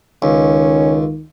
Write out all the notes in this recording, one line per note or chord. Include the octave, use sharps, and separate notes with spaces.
C#2 D#3 C#4